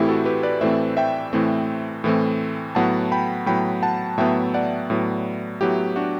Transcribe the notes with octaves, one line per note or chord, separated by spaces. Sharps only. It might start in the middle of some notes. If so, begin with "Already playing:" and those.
Already playing: A2 E3 A3 C4 E4 G4
F#4 A4
G4 B4
B4 D5
A2 E3 A3 C4 C5 E5
E5 G5
A2 E3 A3 C4
A2 E3 A3 C4
A2 F#3 B3 F#5 A5
G5 B5
A2 F#3 B3 G5 B5
F#5 A5
A2 F#3 B3 E5 G5
D5 F#5
A2 F#3 B3
A2 F#3 B3 E4 G4
D4 F#4